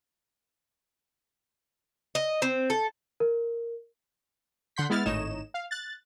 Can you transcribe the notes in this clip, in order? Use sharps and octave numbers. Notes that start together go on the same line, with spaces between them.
D#5
C4
A4
A#4
D3 F#5 C6 G6 B6
G#3 B3 E4 F6 A6
G#1 A2 D#4 C#5 D#5 E7
F5
F#6 A6